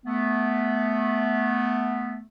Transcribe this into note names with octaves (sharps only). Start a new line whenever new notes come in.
A3 B3